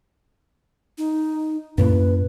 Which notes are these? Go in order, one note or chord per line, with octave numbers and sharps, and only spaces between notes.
D#4
F#2 A2 A#3 B4